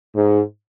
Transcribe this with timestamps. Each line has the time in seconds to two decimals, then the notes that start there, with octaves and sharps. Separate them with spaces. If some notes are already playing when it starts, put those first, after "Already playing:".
0.15 G#2